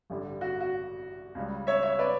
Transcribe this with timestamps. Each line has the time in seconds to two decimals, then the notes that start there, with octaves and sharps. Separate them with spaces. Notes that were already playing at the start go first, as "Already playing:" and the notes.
0.10 A1 G2 D3 G3
0.41 F#4
0.60 F#4
1.35 C#2 C#3 G3
1.67 C#5 E5
1.83 C#5 E5
1.99 B4 D5